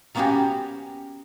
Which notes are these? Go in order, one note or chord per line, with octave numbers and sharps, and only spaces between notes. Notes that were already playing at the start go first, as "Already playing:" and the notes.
F#3 A#3 B3 C#4 F#4 G4